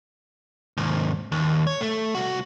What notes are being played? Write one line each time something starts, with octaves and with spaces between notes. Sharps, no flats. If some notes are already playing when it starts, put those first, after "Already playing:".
D#2 G#2
D#2
C#5
A3
C2 F#4